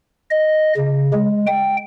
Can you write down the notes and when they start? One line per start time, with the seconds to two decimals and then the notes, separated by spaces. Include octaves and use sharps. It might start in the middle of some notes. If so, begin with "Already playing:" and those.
0.31 D#5
0.77 C#3
1.13 G#3
1.47 G5